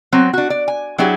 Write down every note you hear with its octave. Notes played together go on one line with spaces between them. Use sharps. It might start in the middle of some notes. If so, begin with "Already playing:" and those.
F#3 C4
D4 F#4
D5
G#5
F#3 D4 E4 G4 G#4